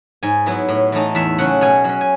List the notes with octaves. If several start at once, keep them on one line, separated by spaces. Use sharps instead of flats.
G#2 G#5
F#3 B3 E4
A2
E3 A3 D#4
E2 E5
C#3 F#3 C#4 F#5
B2 G#5
F#3 C#4
G#5